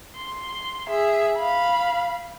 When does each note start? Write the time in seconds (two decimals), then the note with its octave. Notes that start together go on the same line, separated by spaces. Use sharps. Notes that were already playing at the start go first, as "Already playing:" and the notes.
0.17 C6
0.89 G#4 E5
1.37 F5 B5